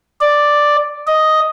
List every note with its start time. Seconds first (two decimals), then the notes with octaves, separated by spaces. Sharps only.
0.21 D5
1.07 D#5